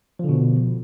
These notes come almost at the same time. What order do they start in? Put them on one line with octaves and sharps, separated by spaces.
F3 D3 B2